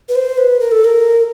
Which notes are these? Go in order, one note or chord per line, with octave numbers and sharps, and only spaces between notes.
B4
C5
B4
A#4
A4
A#4